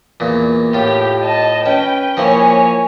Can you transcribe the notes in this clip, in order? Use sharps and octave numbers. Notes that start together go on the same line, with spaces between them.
E2 A#2
A2 F4 G4
D#5 A5
C#4 B4 G5
F3 A#3 E4 C#5 G#5